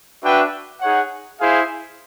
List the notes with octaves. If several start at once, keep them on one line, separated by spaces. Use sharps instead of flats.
D4 F#4 B4 E5 G5
D#4 G#4 C#5 F#5
E4 G#4 C5 F5